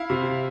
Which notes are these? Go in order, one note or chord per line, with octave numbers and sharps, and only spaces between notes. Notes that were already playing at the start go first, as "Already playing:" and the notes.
Already playing: E4 F5
C3